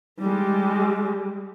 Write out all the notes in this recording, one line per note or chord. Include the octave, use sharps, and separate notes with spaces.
G3 G#3